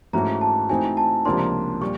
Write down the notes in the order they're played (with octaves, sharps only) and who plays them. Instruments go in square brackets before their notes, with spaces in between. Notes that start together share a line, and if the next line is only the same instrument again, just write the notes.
[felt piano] G#2 E3 A3 C#4 F#4 [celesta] A#5
[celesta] A5
[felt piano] E3 A3 C4 D#4 F#4 [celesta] G#5
[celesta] A5
[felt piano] C#2 C3 F3 A#3 D4 [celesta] C6
[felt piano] A#2 G3 [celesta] C#6